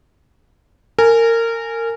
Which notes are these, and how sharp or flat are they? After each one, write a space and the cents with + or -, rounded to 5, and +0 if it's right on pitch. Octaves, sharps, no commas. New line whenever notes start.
A#4 -25 G#5 +0